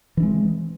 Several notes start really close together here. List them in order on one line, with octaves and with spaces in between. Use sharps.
E3 D4 G#3 C4